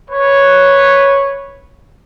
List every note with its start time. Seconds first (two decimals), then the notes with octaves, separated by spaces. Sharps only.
0.10 B4 C#5